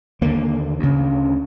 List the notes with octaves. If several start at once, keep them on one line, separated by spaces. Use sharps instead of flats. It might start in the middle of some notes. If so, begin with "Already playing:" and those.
D#2 D3 A#3
D2 C#3